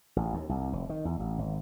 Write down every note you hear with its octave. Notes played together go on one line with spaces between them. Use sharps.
A1
D#2
C2
F1
D#3
E2
A1
G#1